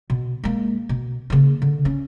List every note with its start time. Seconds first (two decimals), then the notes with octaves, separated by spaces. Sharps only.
0.10 B2
0.44 G#3 A#3
0.89 B2
1.30 C#3 A#3
1.62 D3
1.85 C#4